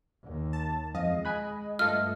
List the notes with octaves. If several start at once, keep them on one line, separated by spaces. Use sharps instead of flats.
D#2
A5
F2 G#3 D#5 F5
G#5 B5 F#6
G2 A3 F4 A4 D#5 F6